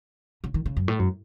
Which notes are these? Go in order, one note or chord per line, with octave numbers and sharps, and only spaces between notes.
C#3
D#3
C#3
F#2
A2
F#2